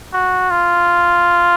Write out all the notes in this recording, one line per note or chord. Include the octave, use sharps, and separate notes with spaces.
F#4
F4